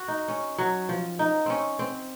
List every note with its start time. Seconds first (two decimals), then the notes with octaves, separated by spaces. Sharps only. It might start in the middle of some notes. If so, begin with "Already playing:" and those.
Already playing: F#4
0.08 D#4
0.28 C#4
0.58 F#3
0.89 F3
1.19 D#4
1.46 C4 C#4
1.79 C4